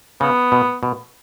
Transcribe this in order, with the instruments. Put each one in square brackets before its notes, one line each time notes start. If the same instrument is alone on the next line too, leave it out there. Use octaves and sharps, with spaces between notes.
[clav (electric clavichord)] C#3 [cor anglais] B3
[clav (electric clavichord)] B2
B2